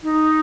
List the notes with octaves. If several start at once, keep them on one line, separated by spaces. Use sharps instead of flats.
D#4